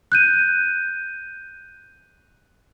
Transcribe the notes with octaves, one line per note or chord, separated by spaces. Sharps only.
F#6 G6 D#7